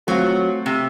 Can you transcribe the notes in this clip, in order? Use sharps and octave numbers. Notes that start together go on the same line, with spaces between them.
F#3 A3 C4 F4
C3